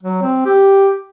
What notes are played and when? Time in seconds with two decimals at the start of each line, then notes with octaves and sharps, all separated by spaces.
0.03 F#3
0.22 C4
0.46 G4